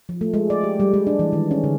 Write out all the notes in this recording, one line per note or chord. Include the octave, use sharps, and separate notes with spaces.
F3
A3
G#3
D5
G4
G3
G#3
D4
E3
D#3
C#4
D3